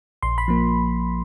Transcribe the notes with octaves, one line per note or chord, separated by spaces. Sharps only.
A#1 C6
B5
F3 A#3